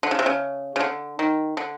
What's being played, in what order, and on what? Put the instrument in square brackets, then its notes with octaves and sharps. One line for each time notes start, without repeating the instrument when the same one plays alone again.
[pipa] D3
C#3
C3
C#3
C#3
D3
D#3
D3